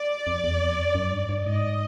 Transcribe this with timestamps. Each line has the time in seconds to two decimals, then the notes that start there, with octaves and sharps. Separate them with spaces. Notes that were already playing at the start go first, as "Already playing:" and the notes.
Already playing: D5
0.27 F2
0.44 E2
0.61 F2
0.95 F#2
1.12 G2
1.29 G2
1.46 G#2 D#5